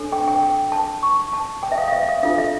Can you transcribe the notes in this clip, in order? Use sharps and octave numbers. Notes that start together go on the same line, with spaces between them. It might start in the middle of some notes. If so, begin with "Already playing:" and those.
Already playing: D4 A4 C#5
G5
G5
G5
A5
C#6
A5
G5
E5
F5
F5
E5
F5
D4 F4 A4 F5
E5